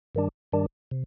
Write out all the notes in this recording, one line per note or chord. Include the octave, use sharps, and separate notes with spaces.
G2 D#3 G3 D4
G2 D#3 G3 D4
C3